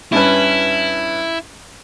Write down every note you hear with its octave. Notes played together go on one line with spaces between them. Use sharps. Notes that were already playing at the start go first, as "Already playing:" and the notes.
G2 C#4 E4 B4